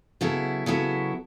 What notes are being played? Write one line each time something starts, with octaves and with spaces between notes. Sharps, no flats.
C#3 F#3 B3 E4 A4
C#3 F#3 B3 E4 A4